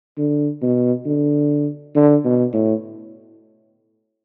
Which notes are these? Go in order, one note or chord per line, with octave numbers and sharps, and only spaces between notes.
D3
B2
D3
D3
B2
A2